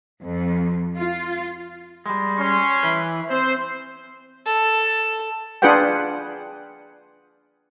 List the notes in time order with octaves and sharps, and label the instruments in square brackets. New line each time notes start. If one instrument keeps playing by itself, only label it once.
[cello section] F2
F4
[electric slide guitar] G3 G#3
[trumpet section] C#4 C6
[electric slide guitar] E3 B4
[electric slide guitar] C4 [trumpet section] C5
[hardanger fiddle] A4
[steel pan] D4 F4 G#4 B4 F#5 G5